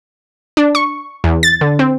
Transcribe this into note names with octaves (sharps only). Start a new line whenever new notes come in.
D4
C#6
E2
A6
D3
C4